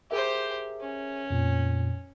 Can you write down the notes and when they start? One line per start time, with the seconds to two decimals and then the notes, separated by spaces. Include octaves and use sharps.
0.11 G4 G#4 A#4 C5 E5
0.80 C#4
1.30 F2 A#2